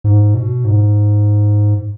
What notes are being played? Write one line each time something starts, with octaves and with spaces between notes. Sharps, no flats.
G#2
B2
G#2